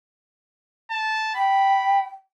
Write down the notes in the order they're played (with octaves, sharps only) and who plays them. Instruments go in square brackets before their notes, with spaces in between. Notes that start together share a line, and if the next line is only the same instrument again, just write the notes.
[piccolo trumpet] A5
[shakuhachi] G5 [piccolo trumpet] B5